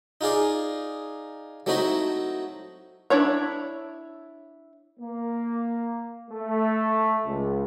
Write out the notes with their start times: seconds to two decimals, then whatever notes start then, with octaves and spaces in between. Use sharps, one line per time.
0.21 D#4 F4 G#4 D5
1.66 F#3 A3 C4 D#4 E4 F#4
3.10 D4 E4 C#5 A#5
5.00 A#3
6.29 A3
7.26 C#2